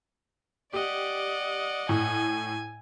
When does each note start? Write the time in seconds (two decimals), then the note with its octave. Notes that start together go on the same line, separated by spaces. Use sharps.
0.73 G4 D5 D#5 F#5
1.89 A2 G#5